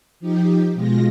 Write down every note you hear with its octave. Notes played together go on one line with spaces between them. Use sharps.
F3 D#4 G4
B2 G#3 F4 A#6